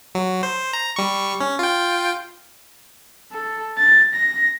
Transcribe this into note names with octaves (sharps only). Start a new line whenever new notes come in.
F#3
C5
A#5
G3 C#6
C#4
F4 G5
A4
A6
A#6